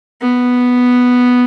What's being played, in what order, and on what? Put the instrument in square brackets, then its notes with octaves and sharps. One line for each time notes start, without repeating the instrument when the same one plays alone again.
[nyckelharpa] B3